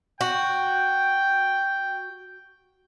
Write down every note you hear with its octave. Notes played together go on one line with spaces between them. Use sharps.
F#4 G5